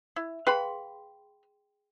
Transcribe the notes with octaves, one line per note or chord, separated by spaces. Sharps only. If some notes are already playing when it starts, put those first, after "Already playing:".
E4
G#4 B4 F5 G5 B5 C6